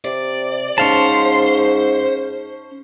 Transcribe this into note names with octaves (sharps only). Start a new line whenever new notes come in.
C3 D5
G#2 C#4 C5 F5 A5